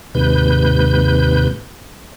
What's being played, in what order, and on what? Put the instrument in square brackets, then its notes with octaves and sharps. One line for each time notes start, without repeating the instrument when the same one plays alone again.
[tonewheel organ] D#2 G#2 C3 B4 G6